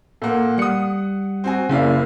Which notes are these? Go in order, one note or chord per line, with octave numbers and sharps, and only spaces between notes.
A#2 A#3 A4 F#5
G3 F#5 D#6 C#7
C4 F#4 G#5
F#1 C#3 A#3 E4 D5 F5